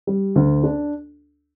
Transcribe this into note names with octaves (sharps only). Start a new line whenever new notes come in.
G3
D2
D4